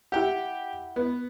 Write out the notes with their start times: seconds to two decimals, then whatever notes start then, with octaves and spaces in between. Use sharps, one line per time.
0.12 E4 G4 F#5 G5
0.96 B3